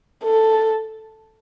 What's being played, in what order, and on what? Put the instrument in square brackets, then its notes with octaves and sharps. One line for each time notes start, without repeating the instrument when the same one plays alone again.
[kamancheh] A4